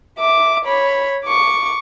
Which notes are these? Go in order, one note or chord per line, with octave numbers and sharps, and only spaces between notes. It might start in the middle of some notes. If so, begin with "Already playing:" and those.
E5 D6
C#5 B5
C#6 D6